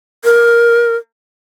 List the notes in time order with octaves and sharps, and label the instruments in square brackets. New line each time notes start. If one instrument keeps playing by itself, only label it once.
[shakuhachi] A#4